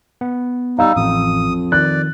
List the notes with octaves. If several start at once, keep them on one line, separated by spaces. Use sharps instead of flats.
B3
G3 D#4 F5 E6
A1 F2 D#6
D#3 D5 F#6